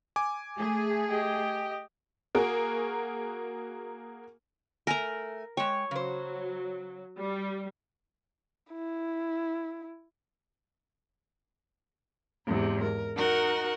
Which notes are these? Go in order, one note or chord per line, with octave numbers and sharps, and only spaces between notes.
G#5 D6
A3 G#4
G4 D#5
A#3 F#4 G#4 A#4
A3 A#4 G#5 A#5
G#3 C#5 G5
C#3 F#3 C5
G3
E4
E2 G#2 C3
A#4
D#4 F#4 A#4 F#5